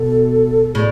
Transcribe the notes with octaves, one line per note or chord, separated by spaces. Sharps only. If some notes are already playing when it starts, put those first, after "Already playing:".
Already playing: B2 A4
A2 G#4